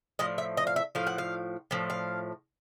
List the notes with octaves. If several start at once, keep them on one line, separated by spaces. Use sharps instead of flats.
A2 F3 D#5
E5
D#5
F5
E5
A2 F3 F5
F#5
F5
A2 F3
F5